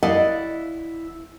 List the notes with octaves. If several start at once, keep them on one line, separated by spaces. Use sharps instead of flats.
E4 D5 D#5 F5 F#5